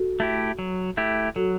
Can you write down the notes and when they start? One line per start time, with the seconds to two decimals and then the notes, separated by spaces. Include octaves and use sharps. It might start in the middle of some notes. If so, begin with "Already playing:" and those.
Already playing: F#4 A4
0.20 A3 E4 G4
0.59 F#3
0.97 A3 E4 G4
1.36 F#3 F#4 A4